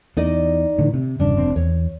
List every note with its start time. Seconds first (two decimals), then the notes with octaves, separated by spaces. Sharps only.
0.17 E2 D#4 D5 D#5
0.78 A2 D3 E3
0.94 C3
1.20 E1 G2 C#3 D4
1.37 F1 C4
1.56 E2 C#5